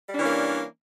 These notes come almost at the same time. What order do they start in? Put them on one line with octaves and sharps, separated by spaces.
G3 D4 E3 C#4 A#3